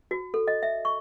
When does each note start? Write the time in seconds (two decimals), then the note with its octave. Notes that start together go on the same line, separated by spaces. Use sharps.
0.11 F#4
0.34 A4
0.48 D#5
0.63 E5
0.85 C#6